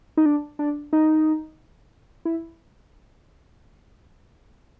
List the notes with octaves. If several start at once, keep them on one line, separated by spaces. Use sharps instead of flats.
D#4
D4
D4
D#4
E4